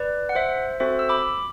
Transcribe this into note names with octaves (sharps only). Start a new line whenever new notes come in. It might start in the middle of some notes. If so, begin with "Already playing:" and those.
Already playing: B4 D5
F#5
C5 E5
C4 F#4 A4 C5 E5
E6
B5 D6